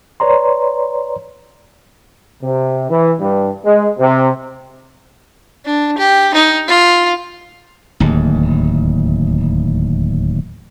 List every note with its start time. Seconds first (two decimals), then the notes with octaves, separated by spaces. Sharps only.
0.20 B4 C#5 D5 A#5 C6
2.42 C3
2.90 E3
3.20 G2
3.64 G#3
3.99 C3
5.65 D4
5.98 G4
6.34 D#4
6.68 F4
8.00 D1 D#2